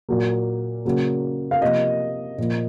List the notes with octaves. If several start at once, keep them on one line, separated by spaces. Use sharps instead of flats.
A#2 F#3 A#3
C#3 F#3 A#3
F5
C3 F3 A#3 D#5
A#2 F3 A#3